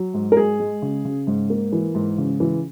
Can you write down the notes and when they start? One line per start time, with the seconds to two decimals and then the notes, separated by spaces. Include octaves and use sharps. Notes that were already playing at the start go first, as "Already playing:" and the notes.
Already playing: F#3
0.14 G#2
0.32 A#4
0.37 G#3 G#4
0.60 G#3
0.82 C#3
1.05 C#3
1.27 G#2
1.50 A#3
1.72 E3
1.95 G#2
2.18 C#3
2.40 E3